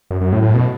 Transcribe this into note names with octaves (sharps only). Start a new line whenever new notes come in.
F#2
F#2
A2
A2
B2